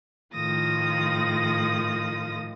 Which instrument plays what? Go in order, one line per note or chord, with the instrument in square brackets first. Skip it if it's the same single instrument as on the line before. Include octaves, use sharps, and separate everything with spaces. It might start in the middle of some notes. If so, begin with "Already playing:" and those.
[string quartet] A2 D#3 F3 D#6 A#6